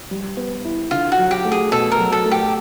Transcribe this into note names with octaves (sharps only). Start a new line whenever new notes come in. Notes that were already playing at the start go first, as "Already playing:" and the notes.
G3
B3
E4
D3 F4
F#4
F#3
G4
A3
G#4
B2 A4
A#4
F#3
A4
A3
G4